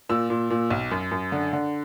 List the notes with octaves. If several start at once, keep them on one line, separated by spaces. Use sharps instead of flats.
A#2 E6
A#2
A#2
B1
F#2
F#2
D3
D3